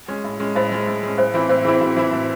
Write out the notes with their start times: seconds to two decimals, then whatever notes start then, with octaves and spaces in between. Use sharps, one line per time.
0.08 G#3 C#4
0.24 A2
0.40 G#3 C#4
0.55 A2 C5 D#5
0.72 G#3 C#4
0.87 A2
1.03 G#3 C#4
1.18 A2 C5
1.34 E3 C4 E4
1.49 A2 C5
1.65 E3 C4 E4 G#4
1.81 A2 F#4
1.96 E3 C4 E4
2.13 A2